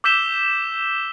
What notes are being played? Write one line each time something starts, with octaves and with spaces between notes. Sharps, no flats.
D6 E6 G6 B6 E7 G7